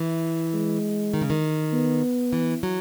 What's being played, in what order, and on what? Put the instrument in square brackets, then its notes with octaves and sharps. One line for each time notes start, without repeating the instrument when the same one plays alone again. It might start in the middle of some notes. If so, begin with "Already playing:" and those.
Already playing: [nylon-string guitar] E3
[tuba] G#3
[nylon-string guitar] D#3
C#3
D#3
[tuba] B3
[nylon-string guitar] E3
F#3